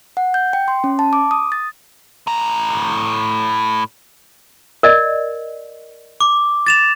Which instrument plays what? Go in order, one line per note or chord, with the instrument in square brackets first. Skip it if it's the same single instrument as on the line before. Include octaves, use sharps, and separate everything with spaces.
[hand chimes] F#5
G6
G5
C6
C#4
A5
D6
D#6
A6
[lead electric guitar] A2 A#5
[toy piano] A#4 D5 D#5
[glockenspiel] D6
A6 E7 F7